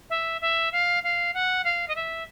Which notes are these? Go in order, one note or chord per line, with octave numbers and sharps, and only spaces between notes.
E5
E5
F5
F5
F#5
F5
D#5
E5